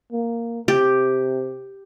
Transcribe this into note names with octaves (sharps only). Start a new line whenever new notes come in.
A#3
C3 G4